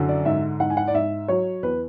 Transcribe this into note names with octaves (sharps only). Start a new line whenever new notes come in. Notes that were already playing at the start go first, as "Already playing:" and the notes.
Already playing: F#2 D3
D5
G#2 E5
G#2 F#5
G#5
F#5
D5
G#2 E5
F#3 C#5
E2 B4